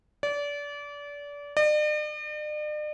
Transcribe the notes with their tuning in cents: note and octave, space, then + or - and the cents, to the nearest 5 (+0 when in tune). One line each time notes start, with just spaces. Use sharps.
D5 -30
D5 +45